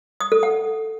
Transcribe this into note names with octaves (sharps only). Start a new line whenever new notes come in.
D#6
A4
F#5